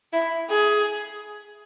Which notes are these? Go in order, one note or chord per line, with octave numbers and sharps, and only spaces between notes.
E4
G#4